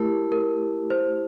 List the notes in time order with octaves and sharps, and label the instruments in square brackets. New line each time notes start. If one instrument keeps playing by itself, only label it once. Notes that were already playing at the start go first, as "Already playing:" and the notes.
Already playing: [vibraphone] A3 E4 G4 [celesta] A#4
[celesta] A#4
C5